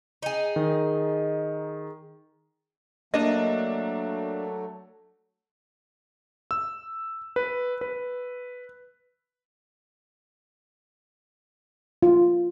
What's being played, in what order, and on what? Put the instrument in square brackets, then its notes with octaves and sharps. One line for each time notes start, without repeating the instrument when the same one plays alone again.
[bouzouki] D#4 G#4
[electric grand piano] D#3
[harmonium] F#3 A3 [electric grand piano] A#3 D4 [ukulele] D#5
[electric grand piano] E6
B4
B4
[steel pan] F4